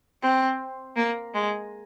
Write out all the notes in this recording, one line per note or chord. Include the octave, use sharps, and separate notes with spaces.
C4
A#3
G#3